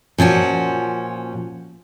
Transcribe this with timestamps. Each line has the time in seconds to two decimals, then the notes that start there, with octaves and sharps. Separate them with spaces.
0.18 A#2 F3 C#4 F#4